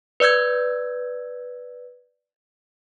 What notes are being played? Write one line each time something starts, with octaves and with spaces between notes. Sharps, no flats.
B4 D5 E6 G6 G#6